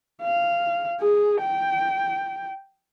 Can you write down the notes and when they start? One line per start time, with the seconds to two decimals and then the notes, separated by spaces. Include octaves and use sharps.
0.23 F5
1.00 G#4
1.42 G5